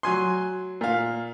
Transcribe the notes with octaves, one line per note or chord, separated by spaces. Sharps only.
F#3 G#5 C6
A#2 F5